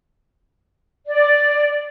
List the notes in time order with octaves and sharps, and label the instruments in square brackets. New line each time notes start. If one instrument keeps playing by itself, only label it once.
[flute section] D5